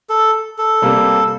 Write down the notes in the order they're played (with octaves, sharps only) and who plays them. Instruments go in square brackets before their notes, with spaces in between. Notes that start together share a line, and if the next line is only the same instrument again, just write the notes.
[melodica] A4
A4
[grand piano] C3 G3 A#3